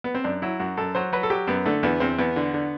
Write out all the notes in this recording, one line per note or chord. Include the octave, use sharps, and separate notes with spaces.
B3
C4
F#2 D4
F#3 E4
F#2 F#4
F#2 A4
F#3 C5
F#3 B4
A4
F#3 G4
F#2 B3
D3 A3
E2 B3
E2 C4
E2 B3
D3
D3